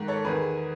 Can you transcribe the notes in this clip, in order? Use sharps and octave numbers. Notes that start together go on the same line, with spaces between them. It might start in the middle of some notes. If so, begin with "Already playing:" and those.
Already playing: G#2 D#3
A4 C#5
E2 D#3 G#4 B4